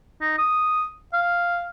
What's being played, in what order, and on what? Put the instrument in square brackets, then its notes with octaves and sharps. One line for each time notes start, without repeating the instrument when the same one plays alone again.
[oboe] D#4
D#6
F5